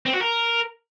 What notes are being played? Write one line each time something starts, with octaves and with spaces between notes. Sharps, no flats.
C4
F#4
A#4